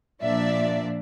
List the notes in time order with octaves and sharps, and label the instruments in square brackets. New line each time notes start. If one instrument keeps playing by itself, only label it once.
[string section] A#2 F3 A#3 D4 D5 E5